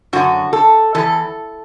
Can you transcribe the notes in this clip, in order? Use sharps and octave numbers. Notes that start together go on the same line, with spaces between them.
F#2 D3 F#4
A4
E2 E3 A4